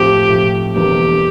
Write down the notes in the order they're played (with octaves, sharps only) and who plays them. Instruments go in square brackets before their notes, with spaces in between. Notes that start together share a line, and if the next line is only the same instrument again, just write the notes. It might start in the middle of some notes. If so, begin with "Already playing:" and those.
Already playing: [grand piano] A2 F3 C4 [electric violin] G4
[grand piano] A2 F3 C4
[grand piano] E1 E2 D3 G3 A#3 [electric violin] G4